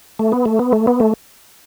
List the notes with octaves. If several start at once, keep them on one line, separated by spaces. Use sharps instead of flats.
A3
B3
A3
B3
A3
B3
A3